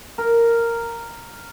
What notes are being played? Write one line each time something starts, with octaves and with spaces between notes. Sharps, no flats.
A#4